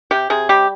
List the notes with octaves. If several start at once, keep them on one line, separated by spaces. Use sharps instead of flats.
C3 G4
C3 G#4
G3 G4